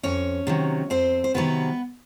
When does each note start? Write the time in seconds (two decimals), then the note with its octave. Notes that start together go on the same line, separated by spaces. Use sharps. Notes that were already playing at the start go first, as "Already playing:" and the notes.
0.03 F2 C#4 C#5
0.47 C3 D#3 F#3
0.90 F2 C4 C5
1.24 C5
1.34 C3 D#3 F#3 B3 B4